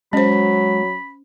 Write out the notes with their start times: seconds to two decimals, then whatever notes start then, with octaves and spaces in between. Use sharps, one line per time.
0.13 F#3 G#3 C#4 C5 B5